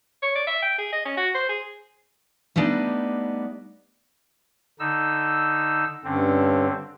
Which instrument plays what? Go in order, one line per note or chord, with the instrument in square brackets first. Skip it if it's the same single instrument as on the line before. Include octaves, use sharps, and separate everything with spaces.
[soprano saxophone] C#5
D5
E5
G5
G#4
D#5
C#4
F#4
C5
G#4
[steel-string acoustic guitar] G3 A3 B3 D4 D#4
[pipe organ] D3 D#4 E6
[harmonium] G2 C#4 [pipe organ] D3 C4